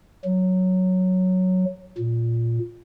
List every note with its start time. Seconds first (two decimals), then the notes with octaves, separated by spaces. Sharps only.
0.24 F#3
1.98 A#2